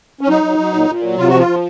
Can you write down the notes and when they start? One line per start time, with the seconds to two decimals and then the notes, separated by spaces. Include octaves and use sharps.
0.21 C#4
0.28 F#3 D#4
0.44 F#3
0.58 F#3
0.73 A#2
0.88 A#2
1.03 F#3
1.18 C3 F4
1.28 F3 F#4
1.38 F4
1.48 F3